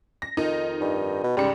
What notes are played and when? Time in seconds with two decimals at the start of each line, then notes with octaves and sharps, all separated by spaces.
0.22 A#6
0.37 F2 D#3 D#4
0.81 G2
1.24 B2
1.37 G#2 C#3 G3 C#7